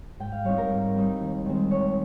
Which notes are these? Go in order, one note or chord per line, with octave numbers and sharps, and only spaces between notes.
G#2 G5
F5
G3 C4 D#4 C#5
A#4
G#2
G3 C4 D#4
D#2
D#3 G#3 C4
D#2 C#5